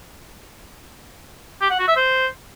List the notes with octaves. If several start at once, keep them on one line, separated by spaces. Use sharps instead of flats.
G4
F#5
F#4
E5
C5